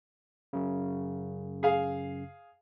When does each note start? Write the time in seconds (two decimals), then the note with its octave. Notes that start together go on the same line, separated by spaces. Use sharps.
0.53 F#2 C#3
1.63 G#4 F5